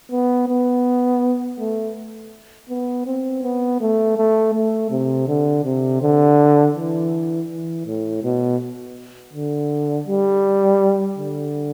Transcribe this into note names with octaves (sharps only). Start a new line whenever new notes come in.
B3
B3
A3
B3
C4
B3
A3
A3
A3
C3
D3
C3
D3
E3
E3
A2
B2
D3
G3
D3